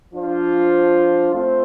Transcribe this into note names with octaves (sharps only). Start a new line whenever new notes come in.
F3 D4 F4 C5
A3 C4 F4 C5